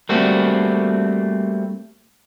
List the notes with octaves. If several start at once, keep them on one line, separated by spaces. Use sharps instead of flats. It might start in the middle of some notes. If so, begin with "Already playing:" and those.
G3 A3 A#3 C4 F#4